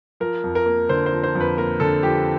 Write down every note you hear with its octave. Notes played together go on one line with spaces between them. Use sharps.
F3 A#4
F2
A#4
A#3
D3 C5
C5
F3
C5
F2
B4
A#3 A#4
D3 A4
F3 G4